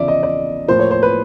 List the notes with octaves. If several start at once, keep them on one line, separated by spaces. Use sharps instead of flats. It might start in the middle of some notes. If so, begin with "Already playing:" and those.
Already playing: E2 C#3 F3 D5 E5
D#5
D5
A2 F3 A#3 C5
C#5
C5
B4